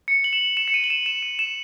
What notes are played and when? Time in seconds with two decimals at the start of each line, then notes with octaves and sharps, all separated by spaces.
0.08 C#7
0.24 F#7
0.33 E7
0.57 E7
0.68 C#7
0.74 D#7
0.84 F#7
0.90 E7
1.06 E7
1.22 D#7
1.39 E7